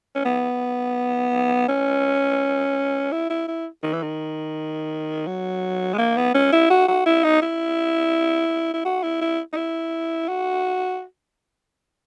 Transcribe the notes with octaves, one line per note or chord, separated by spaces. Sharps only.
C#4
B3
C#4
E4
E4
E4
D#3
E3
D#3
F#3
G#3
A#3
B3
C#4
E4
F#4
F#4
E4
D#4
E4
E4
F#4
E4
E4
D#4
E4
F#4